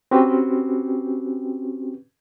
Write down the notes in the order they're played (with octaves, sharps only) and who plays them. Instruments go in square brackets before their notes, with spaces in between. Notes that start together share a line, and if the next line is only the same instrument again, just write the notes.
[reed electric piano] C4 C#4 F#4 G4 B4